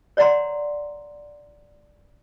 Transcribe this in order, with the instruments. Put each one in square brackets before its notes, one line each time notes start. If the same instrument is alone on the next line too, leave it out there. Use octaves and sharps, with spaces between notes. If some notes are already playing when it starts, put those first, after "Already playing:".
[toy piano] C#5 D5 F#5 A#5 C6